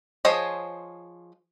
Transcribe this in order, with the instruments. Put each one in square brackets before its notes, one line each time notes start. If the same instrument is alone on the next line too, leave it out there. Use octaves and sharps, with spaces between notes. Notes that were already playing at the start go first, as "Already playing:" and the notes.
[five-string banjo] F3 G#4 C5 C#5 D#5